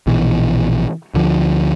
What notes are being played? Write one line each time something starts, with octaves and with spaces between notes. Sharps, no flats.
A#1 B2 E3
D2 D3 F3